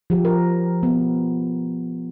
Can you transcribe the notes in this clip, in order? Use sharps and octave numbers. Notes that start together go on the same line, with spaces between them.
F3 G4
A#4
B3